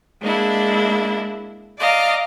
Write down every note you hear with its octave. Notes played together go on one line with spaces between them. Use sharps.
G#3 A#3 D4 E4
D5 D#5 F5 A#5